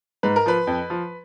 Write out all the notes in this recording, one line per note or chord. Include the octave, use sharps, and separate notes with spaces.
G#2 B4
A#4
F3 B4
F2
F3